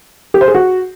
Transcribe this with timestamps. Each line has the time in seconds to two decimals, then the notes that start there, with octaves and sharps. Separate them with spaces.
0.34 G4
0.41 C5
0.48 G#4
0.55 F#4